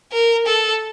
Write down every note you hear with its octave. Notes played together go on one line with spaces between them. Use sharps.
A#4
A4